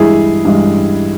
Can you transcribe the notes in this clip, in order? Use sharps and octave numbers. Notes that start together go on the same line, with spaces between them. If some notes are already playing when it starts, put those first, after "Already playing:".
Already playing: G2 E3 G#3 E4 G#4
G2 E3 G#3